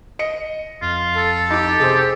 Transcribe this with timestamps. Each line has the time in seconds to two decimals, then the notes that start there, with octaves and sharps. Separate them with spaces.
0.19 D#5 C#7
0.82 F2 F4
1.17 A4
1.50 D#4 G4 D6
1.80 C3 G#4 C5